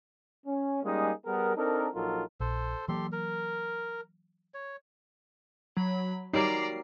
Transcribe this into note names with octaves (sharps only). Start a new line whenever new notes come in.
C#4
G3 G#3 A#3 C#4 D#4 G#4
G3 B3 G#4 A#4
C4 D4 D#4 A4 A#4
A#1 F#3 D#4 F4 A4 A#4
A#1 A4 C5
E3 F#3 A#3 G4 A4 C6
A#4
C#5
F#3 B5
F#3 G3 A#3 D#4 D5 A#5 C7